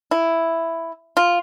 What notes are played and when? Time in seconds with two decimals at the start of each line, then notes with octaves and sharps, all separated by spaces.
0.11 E4
1.17 F4